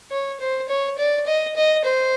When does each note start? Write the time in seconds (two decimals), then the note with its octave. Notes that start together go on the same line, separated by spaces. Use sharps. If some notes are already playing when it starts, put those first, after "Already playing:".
0.11 C#5
0.40 C5
0.69 C#5
0.98 D5
1.26 D#5
1.56 D#5
1.84 C5